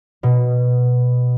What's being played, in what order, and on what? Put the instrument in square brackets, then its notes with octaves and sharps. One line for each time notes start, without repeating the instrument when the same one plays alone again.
[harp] B2